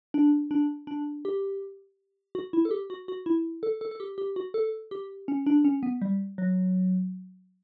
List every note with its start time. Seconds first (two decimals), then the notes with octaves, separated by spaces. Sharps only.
0.14 D4
0.51 D4
0.87 D4
1.25 G4
2.35 F#4
2.53 E4
2.65 A4
2.71 G4
2.90 F#4
3.08 F#4
3.26 E4
3.63 A4
3.81 A4
3.91 A4
4.00 G4
4.18 G4
4.36 F#4
4.54 A4
4.91 G4
5.28 C#4
5.46 D4
5.65 C#4
5.83 B3
6.02 G3
6.38 F#3